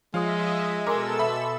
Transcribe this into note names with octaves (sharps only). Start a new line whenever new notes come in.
F3 G#3 F4 C#5 D#5 E5 D#6
B2 A4 A#4 G#5 C6 D6 E6
E5 B5